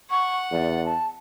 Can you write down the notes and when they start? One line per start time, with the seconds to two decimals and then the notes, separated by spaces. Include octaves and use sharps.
0.10 F#5 C#6
0.52 E2 D5
0.85 A5